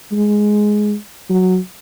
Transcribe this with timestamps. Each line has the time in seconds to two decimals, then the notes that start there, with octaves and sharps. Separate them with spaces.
0.12 G#3
1.29 F#3